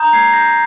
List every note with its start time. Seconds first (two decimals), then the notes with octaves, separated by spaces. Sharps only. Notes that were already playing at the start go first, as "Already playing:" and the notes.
Already playing: A#5 D#6 G6
0.13 G#6 C7
0.33 G6 A#6